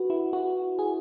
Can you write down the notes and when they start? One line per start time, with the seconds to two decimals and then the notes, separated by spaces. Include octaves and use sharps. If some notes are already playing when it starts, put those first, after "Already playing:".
Already playing: F#4 B4
0.10 E4
0.33 F#4
0.79 G#4